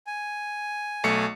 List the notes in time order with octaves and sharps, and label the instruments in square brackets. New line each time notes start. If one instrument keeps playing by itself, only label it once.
[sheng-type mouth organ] G#5
[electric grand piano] B1 A3 C#7